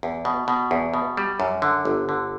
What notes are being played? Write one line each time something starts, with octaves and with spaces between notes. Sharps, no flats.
E2
B2
B2
E2
B2
G3
F#2
D3
G1
D3